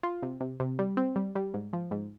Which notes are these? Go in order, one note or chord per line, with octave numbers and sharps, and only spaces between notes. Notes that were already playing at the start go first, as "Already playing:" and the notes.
F4
C3
C3
C3
G3
C4
G3
G3
G#2
F3
G#2